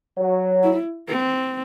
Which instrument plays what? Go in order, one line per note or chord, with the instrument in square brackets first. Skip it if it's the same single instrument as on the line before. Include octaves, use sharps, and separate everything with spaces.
[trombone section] F#3
[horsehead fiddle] E4
C4